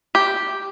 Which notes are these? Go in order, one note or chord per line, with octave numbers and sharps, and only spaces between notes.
G4